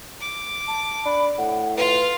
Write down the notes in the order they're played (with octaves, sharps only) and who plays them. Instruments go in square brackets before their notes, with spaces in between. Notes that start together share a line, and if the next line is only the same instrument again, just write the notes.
[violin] D6
[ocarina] A5
[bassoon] D4 [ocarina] B5
[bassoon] A2 [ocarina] F#5
[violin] F4 F5 [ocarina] B4